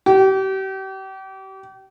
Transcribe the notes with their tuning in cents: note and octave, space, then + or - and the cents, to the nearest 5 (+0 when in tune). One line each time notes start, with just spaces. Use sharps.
G4 -35